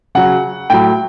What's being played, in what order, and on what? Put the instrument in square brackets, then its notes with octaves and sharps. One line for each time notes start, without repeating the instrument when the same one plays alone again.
[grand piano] C#3 F#3 F#5
A2 F#3 G5